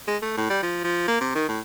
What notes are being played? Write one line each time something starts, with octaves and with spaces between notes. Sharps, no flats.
G#3
A3
A2
G3
F3
F3
A#3
C3
D#3
A2